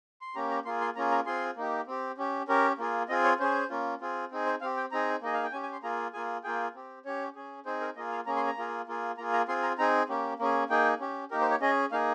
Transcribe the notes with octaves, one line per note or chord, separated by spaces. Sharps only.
C6
A#3 C#4 G4 A#5
A#5
A#3 F4 G#4 C6
C6
A#3 C#4 F4 G#4 A#5
A#5
C4 F4 G#4 C6
A#3 D#4 G4
C4 G4
C#4 G4
C#4 G4 A#4
A#3 F4 G#4
C4 F4 G#4 D#5
C#5
C#4 G#4 C5
A#3 C#4 F4
C4 F4 G#4
C4 D#4 G#4
C5
C4 G4 F5
G5
C4 D#4 G#4 A#5
A#3 D#4 G#4 D#5
F5
G5
C#4 G4 G#5
G#5
C6
A#3 F4 G#4 A#5
A#3 F4 G#4 G#5
A#3 F4 G#4 G5
C4 G4
C#4 G4 C#5
C#4 G#4
C4 D#4 G#4 C5
A#4
A#3 F4 G#4 D#5
F5
A#3 C#4 G#4 A#5
C6
A#5
A#3 F4 G#4
A#3 F4 G#4
A#3 F4 G#4 A#5
A#5
C4 F4 G#4 C6
A#5
C4 D#4 G#4 A#5
A#3 C#4 G4
A#3 C#4 G#4
A#3 D#4 G#4 G5
C#4 G4
A#3 D#4 G4 A#4
C5
C#5
C#4 G#4 D#5
A#3 D#4 G#4 F5